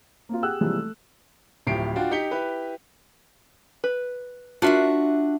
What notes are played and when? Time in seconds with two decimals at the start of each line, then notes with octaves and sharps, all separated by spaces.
0.29 A#3 C4 F4
0.42 G4 G#4 F#5 G5 E6 F#6
0.61 C3 E3 F3 G3 G#3 A#3
0.76 A3
1.67 D1 A2 F3 G4 C7 D7
1.96 D4 F4 F#4 G5
2.11 D#4 G4 B6 C#7 G7
2.31 E4 G4 B4
3.84 B4
4.62 D4 F4 F#4 A#4 E5 F#5